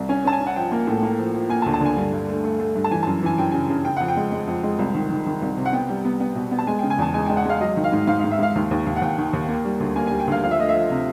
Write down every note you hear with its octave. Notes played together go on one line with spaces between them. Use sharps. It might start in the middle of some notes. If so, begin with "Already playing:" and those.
Already playing: C2
C#4 G#5
C#4 A5
G#5
C#4
F#5
F3 G5
A#3
A2
A#3
F3
F3
A#3 G#5
A5
D2
A5
D3 G#5
G2
G2
A3
A3
A3
G2
A5
E3 G#5
A5
F#2
E3 G#5
F#2 G5
C#3 G#5
C#3
C#3 G5
F2 F#5
G5
G#3
G#3
F2
G#3
C2
D#3
D#3
D#3
C2
C3
F#5
B3 G5
G3
B3
B3
B2
B3
A5
G#3 G#5
G5
C#3
G#5
E2 A5
G#3 G#5
G#3 G5
F#5
G#3 F5
F#3 D#5
D#3
F5
G#2
G#2 F5
F5
G#2
E5
G#2 F5
D#2
D#2
D#2
F#5
D#2 G5
D#3
D#2
A#3
G3
D2
A#3 G#5
G#5
G3
G5
D2 F5
F3 F5
E5
A3 D#5
E5
F3
C3